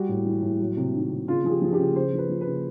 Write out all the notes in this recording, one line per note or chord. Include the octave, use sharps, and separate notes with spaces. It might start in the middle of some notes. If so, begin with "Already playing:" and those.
Already playing: G3 F#4
A2
E3
A2
F#3
C3
D#3
C3
C#3 F4
F3 G#4
G4
F3
G#4
G4
C#3
C#3 C5
F3
B4
F3
B4
C#3